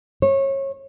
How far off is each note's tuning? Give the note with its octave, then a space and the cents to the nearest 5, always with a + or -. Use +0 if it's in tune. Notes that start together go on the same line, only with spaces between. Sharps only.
C#5 -25